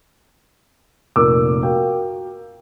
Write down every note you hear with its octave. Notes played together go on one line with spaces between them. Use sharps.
F1 A#2 A#4 D6 E6
F#4 A#4 F5 G5